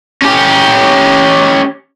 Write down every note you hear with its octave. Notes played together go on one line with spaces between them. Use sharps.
C#4 G4